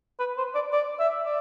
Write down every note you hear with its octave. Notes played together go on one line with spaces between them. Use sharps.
B4
C5
D5
D5
E5
D5